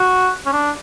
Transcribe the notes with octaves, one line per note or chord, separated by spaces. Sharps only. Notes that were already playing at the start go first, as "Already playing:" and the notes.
Already playing: F#4
C#4
D4